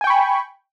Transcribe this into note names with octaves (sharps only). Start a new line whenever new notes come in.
G5 G#5 B5 C#6